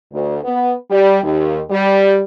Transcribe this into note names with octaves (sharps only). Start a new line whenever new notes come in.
D2
B3
G3
D#2
G3